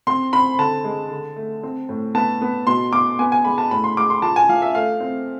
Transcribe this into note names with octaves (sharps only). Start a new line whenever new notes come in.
C4 C6
C4 B5
D3 A5
G#3
D3
A3
C4
A2
B3 A5
B3
B2 C6
B2 D6
B3 G#5
G#5
G#3 B5
A5
A2 B5
C6
G#3 D6
C6
F3 A5
G#5
F3 F5
E5
A3 F5
C4